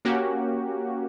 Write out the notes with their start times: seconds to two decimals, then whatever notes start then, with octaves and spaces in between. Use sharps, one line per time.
0.05 A#3 C#4 F#4 G4